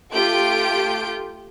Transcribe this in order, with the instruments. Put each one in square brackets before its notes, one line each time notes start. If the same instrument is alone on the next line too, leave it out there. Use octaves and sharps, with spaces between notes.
[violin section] A3 F4 G4 G6 D7